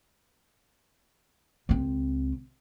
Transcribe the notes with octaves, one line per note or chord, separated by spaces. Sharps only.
C#2 C4